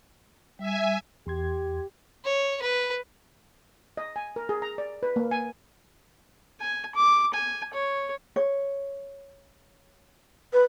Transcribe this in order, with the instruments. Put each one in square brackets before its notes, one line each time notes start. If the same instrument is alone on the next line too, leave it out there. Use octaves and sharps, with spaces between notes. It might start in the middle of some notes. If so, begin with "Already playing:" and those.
[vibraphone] G3 [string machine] E5 G#5
[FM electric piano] E2 C6 G#6 [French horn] G4
[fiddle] C#5
B4
[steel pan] D#5
G#5
A#4
G#4
A#5
D5
B4
A#3
G#5
[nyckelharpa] G#5
D6
G#5
C#5
[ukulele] C#5
[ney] B4